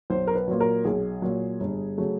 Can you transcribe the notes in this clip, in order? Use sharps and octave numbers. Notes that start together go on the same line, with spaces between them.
B1 C5
A#4
B4
A#2 F#3
A#4
B1 G#4
A#2 F#3
G1
C#3 F#3 A3